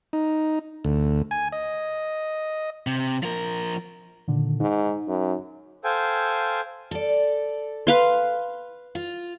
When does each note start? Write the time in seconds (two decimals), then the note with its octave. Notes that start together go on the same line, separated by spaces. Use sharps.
0.13 D#4
0.85 D2
1.31 G#5
1.52 D#5
2.87 C3
3.23 F3 A#4
4.28 A#2 D3 D#3
4.60 G#2 D#4
5.08 F#2
5.84 A4 C5 F5 G5 G#5
6.91 A4 D5
7.87 B4 F5 C6
8.95 F4